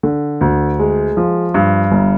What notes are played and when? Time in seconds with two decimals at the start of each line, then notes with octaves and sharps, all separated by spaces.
0.03 D3
0.41 D2
0.79 G#3
1.17 F3
1.54 G2
1.91 G1